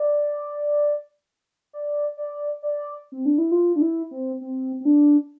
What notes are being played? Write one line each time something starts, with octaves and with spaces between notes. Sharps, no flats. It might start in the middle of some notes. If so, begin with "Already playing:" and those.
Already playing: D5
D5
D5
D5
C4
D4
E4
F4
D4
E4
C4
C4
C4
D4